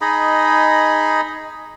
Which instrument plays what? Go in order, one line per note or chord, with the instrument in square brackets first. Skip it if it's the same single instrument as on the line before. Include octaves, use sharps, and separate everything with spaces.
[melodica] D#4 G#4 D#5 B5